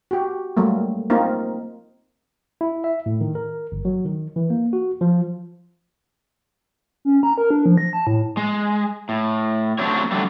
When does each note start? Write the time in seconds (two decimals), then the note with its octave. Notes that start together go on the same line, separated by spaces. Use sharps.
0.11 F#4 G4
0.57 F#3 G3 A3 A#3
1.10 A#3 C4 D#4 F4 A#4
2.61 E4
2.84 E5
3.06 A2
3.21 D#3
3.35 A#4
3.72 G1
3.85 F#3
4.05 D#3
4.36 E3
4.50 A#3
4.73 F#4
5.01 F3
7.05 C#4
7.23 A#5
7.38 A#4
7.51 D4
7.66 F3
7.78 A#6
7.93 A5
8.07 A2
8.37 G#3
9.09 A2
9.79 F#3 A3 C4 D4 G4 C#5
10.11 D3 F#3 G3 A3